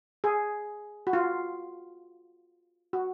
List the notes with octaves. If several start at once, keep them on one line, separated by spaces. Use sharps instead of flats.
G#4
F#4
F4
F#4